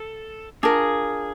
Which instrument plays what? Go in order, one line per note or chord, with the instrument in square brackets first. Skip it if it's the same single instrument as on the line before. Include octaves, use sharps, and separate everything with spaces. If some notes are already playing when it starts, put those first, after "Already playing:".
Already playing: [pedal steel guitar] A4
[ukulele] D4 F4 A#4 [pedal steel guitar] G#4